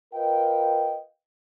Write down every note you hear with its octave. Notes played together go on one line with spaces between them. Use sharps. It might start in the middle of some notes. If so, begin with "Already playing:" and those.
F4 A#4 B4 D#5 F5 G5